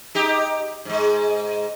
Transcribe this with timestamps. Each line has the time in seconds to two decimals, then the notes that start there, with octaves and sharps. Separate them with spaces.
0.15 D#4 G4
0.85 G#2 G#3